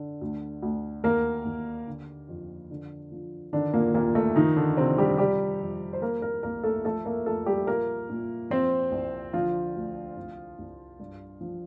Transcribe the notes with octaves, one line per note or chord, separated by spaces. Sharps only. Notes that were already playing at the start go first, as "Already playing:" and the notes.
Already playing: D3
D2
D2
D#2 A#3 A#4
D#2
D3
F2
D3
F3
D3 D#3 D4
A#2 A#3
D#2 A#2 A#3
A3
D#3 F3 D#4
D3 D4
C3 F3 C4
G3 G4
C3 G3 G4
F2
C5
F3 A#3 A#4
A#3 A#4
C2 A#3 A#4
A3 A4
F3 A3 A4
A#3 A#4
F2 A3 A4
G3 G4
A#2 A#3 A#4
A#2
F3 C4 C5
C2
D3 F3 F4
D2
C2
C2
G2
F3